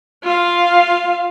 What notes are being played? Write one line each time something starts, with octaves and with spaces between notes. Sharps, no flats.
F4 F5